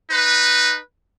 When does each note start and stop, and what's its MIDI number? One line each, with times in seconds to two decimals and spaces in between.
0.11 0.79 63
0.11 0.79 71